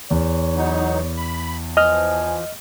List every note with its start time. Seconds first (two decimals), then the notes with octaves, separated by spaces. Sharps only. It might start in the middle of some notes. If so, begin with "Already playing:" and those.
0.11 E2 C#5
0.56 F#3 B3 D#4
1.17 B5
1.77 E3 F3 D#5 G#5 F6